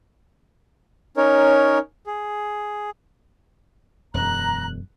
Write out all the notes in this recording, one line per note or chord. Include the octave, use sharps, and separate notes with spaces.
C#4 D#4 A#4 C#5
G#4
E1 F#2 A#5 F#6